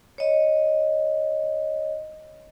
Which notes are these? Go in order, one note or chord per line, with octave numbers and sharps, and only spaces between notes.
C#5 D#5